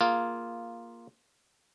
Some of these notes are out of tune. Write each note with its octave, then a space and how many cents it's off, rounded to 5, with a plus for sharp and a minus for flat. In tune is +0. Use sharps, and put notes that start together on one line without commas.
A#3 +0 F4 +0 G#4 +0